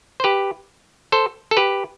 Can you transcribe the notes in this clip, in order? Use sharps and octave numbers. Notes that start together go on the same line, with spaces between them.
C5
G4 B4
A4 C5
A4
G4 B4